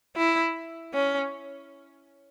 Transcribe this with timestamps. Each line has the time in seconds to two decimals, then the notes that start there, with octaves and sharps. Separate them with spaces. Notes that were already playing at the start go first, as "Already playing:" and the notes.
0.17 E4
0.94 C#4